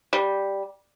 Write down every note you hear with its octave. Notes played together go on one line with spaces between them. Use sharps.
G3